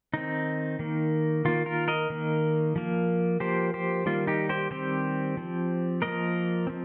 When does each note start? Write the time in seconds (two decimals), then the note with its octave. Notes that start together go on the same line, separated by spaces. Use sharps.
0.14 D#3 C4 D#4
0.79 D#3 A#3
1.45 D#3 A#3 F4
1.66 F4 A#4
1.88 A#4 D#5
2.10 D#3 A#3
2.76 F3 A#3
3.40 F3 A#3 G4 C5
3.74 G4 C5
4.06 D#3 G3 A#3 F4
4.27 D#4 G4
4.49 G4 C5
4.71 D#3 G3 C4 G4 C5
5.37 F3 C4
6.02 F3 A#3 A#4 D#5
6.67 F3 C4